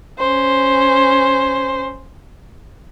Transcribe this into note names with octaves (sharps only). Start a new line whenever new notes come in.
C#4 C5